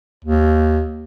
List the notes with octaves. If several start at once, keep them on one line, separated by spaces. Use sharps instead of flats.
D#2